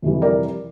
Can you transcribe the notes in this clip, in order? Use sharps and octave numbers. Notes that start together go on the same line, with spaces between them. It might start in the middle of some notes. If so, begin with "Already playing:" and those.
F2 C3 E3 G3
A#4 D5